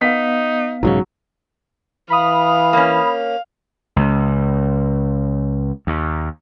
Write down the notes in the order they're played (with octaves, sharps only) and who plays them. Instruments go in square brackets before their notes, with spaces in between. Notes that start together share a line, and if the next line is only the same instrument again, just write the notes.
[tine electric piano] B3 F5 [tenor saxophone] D#4 [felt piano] B6
[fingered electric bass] B1 G#2 C#3 [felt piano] F#3
[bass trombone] E3 [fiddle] F5 [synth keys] B5 D#6
[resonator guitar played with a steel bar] A#3 C4 C#4
[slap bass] C#2
D#2